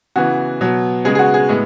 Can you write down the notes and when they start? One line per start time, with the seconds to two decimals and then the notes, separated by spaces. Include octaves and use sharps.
0.16 C#3 E3 B3 F#4
0.61 B2 F#3 B3
1.05 C#3 G#3 B3 G#4
1.15 G#4
1.19 F#4
1.34 G#4
1.49 A2 G#3 B3